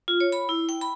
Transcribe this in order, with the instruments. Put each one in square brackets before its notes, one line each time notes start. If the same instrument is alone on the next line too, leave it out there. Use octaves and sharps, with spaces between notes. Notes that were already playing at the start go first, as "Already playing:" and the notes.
[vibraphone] F4
C#5
B5
E4
G5
B5